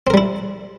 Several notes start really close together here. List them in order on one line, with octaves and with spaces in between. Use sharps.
C4 A#4 G3 E4